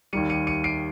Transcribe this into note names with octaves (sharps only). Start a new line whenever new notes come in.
D#2 D#3 G3 C#7 D#7
C#7 D#7
C#7 D#7
C7 D7